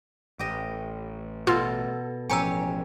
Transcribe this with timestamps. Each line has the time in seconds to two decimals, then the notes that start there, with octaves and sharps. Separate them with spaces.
0.39 A1 G4 D#5
1.47 B2 F4 A4 F6
2.30 A1 F3 C#4 G4 C#5 G#5 A#5 E6